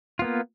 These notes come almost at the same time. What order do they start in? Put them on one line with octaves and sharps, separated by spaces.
F4 B3 A#3